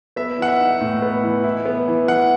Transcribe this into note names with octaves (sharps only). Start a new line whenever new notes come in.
B3 E5
E3 F#5
E5
D#4
A2
B3
E3
E4
B3
E3
E3 F#5